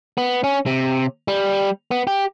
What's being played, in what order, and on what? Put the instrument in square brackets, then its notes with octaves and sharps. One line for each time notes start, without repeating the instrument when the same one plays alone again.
[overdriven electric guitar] B3
C#4
C3
G3
B3
G4